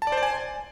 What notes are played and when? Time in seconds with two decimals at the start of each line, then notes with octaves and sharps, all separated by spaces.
0.02 A5
0.07 D5
0.12 C5
0.17 D5
0.23 G#5